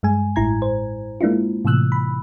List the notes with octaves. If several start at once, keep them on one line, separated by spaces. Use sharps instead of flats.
G2 G#3 G#5
A1 A2 E4 A#5 G#6
C5
G#3 A#3 D4 E4 F4
A2 C3 E3 E6 F#6
B5